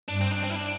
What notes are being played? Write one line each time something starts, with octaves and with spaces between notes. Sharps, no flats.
G2 D4
C4
D4
C4
E4
D4